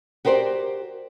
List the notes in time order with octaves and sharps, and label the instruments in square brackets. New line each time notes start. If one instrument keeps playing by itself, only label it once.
[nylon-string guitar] F#4 G4 A#4 C5 D5